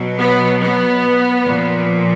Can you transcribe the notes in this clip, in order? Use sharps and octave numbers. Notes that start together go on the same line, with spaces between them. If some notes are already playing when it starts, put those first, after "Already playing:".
Already playing: B2 F#3
B3
B3
A#2 F3